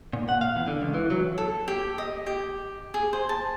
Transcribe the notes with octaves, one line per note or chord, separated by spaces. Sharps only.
A#2
F#5
F5
E2
D3
C#2
E3
F#3
A4
G4
D#5
G4
G#4
C5
A5